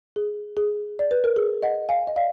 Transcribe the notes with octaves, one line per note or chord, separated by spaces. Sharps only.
G#4
G#4
D5
B4
A#4
G#4
D#5 F#5
F5 G#5
D#5
D5 F5